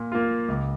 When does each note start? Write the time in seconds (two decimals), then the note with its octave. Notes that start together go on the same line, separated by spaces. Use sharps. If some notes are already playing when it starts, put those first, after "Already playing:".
Already playing: A#2
0.12 A#3 F4
0.48 C#2